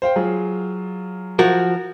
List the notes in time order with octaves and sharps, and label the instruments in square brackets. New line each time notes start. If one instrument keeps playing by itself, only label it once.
[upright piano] C5 F5 G5
F#3 F4 G#4
[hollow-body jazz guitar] F3 F#4 A#4